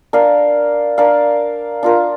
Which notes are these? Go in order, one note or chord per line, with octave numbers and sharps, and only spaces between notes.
D4 A#4 D5 F5
D4 A#4 D5 F5
D4 F4 A#4